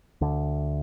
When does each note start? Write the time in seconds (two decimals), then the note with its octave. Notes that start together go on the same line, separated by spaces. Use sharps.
0.21 D2 D3